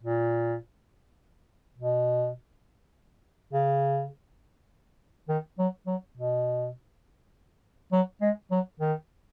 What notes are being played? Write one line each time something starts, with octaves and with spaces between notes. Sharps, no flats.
A#2
B2
C#3
D#3
F#3
F#3
B2
F#3
G#3
F#3
D#3